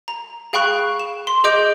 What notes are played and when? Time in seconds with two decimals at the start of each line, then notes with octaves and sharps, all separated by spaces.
0.08 A#5
0.53 G#4 F5 G5 B5 C#6 F#6
1.00 E7
1.27 C6
1.44 G#4 D#5 D6 G6 D7